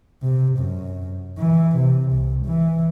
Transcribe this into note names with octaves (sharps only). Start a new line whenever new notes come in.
C3
F#2
E3
C3
C2
E3